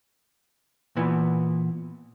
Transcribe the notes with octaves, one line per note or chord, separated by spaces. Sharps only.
A#2 E3 B3